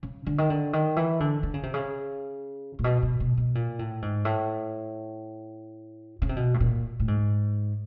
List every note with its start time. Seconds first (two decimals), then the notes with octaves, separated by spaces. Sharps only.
0.03 C#3
0.26 D3
0.38 D#3
0.50 D3
0.73 D#3
0.96 E3
1.20 D3
1.43 D3
1.54 C#3
1.63 C3
1.74 C#3
2.79 A#2
2.84 B2
3.03 B2
3.20 B2
3.37 B2
3.55 A#2
3.79 A2
4.02 G#2
4.25 A2
6.22 C#3
6.29 C3
6.36 B2
6.54 A2
6.60 A#2
7.00 A2
7.08 G#2